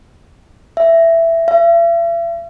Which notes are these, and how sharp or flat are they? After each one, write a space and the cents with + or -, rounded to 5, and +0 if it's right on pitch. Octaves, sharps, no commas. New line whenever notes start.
E5 +10
E5 +45